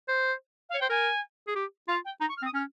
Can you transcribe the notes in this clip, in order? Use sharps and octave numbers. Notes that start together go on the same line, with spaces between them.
C5
C#5 F5
C5 G5
A#4 G#5
G#4
G4
F4 F5
G5
D#4 A#5
C#6
F6
C4
D#6
C#4 F6